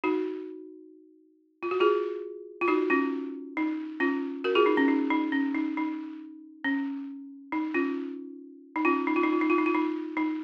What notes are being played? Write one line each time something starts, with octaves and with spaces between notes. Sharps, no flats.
D#4 F#4
F4
F#4
F4 G#4
F4
D#4 F#4
C#4 F4
D#4
C#4 F4
F#4 A#4
F4 G#4
D#4
C#4
D#4
D#4
C#4
D#4
D#4
C#4
D#4
C#4 F4
D#4
C#4 F4
D#4
F4
D#4
F4
D#4
F4
D#4
F4
D#4
D#4